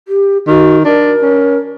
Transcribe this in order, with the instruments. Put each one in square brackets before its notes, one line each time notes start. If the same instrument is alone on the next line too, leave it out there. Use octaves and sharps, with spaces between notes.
[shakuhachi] G4
[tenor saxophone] D#3 [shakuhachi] F#4
[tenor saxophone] D4 [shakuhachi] A#4
[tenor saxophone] C#4